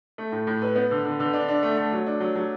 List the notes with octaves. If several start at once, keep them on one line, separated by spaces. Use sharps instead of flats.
A3
A2
A2
B4
B3
D3
D3
D3
D4
D4
A3
A3
F#3
D4
F#3
F#3